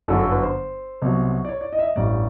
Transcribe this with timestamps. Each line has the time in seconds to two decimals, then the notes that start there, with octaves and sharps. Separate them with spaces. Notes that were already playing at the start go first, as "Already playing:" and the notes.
0.08 G1 F#2 D3 F#3 A4
0.19 A4
0.31 B4
0.43 C5
1.02 C2 B2 F#3
1.45 D5
1.49 C#5
1.61 D5
1.73 D#5
1.79 E5
1.84 D#5
1.95 A1 G2 E3 D5